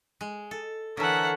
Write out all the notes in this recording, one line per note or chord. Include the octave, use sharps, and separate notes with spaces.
G#3
A4
D3 E3 A4 A#4 C#5 E5 F#5